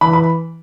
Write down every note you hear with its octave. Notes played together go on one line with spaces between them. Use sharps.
E3 B5
B5